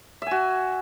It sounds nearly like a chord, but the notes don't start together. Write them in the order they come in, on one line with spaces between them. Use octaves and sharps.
E5 G#5 F#4